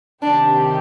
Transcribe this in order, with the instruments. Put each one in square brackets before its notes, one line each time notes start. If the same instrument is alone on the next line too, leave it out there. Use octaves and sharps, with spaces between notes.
[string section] C3 D#3 G3 C4 G4 [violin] D4